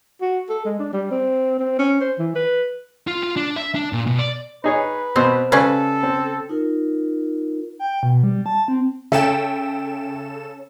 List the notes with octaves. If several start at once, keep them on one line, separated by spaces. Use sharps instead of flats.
F#4
A4
G#3
D4
G3
C4
C4
C#4
C5
E3
B4
F4
F4
D4
E5
D4
A#2
B2
D5
D#4 G#4 B4 C#5
B2 C4
C#3 G3 C#4 A4 B4
C4
D#4 F4 A#4
G5
B2
G3
A5
C4
C#3 C#4 A4 E5 G5 E7